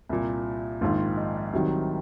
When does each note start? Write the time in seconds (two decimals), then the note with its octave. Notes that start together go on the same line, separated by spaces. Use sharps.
0.09 C2 A#2
0.81 A#1 G#2 D#3 F4
1.17 D#4
1.53 C2 C3 D#3 F#3